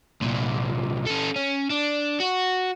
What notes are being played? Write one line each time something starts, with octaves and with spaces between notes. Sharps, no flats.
C2 A#2
C#4 A4
C#4
D4
F#4